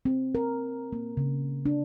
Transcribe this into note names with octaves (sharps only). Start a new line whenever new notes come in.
C4
A#4
A#3
C#3
D4